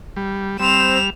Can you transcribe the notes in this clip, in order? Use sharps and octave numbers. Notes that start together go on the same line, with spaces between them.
G3
G3 C4 C5 E7 F7